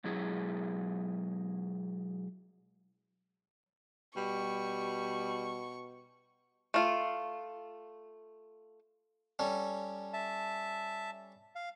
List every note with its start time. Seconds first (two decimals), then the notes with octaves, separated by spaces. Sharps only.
0.04 B2 F#3 G#3 E4 G#4
4.16 B2 G3 C#6
6.74 A3 F4
9.39 G3 C#4 A4
10.13 E5 A5
11.55 F5